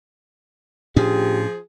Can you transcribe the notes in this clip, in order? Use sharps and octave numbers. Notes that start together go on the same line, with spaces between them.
A2 F3 C#4 D4 G4 G#4